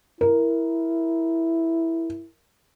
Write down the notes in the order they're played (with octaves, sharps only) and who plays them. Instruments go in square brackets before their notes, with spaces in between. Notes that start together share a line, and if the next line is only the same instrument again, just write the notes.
[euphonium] E4 [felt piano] A#4